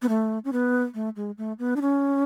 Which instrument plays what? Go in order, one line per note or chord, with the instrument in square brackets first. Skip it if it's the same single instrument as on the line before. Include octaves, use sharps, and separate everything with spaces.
[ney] B3
A3
C#4
B3
A3
G#3
A3
B3
D4
C#4